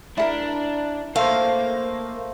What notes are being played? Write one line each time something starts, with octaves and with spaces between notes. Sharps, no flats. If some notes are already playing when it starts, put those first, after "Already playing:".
D4 E4 A4 A#4
A3 A#3 C5 F5